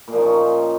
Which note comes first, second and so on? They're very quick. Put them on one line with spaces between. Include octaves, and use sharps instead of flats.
A#2 F3 D#4 C#4